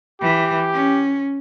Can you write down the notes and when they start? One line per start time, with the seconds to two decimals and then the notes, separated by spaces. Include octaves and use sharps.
0.21 E3 G4
0.73 C#4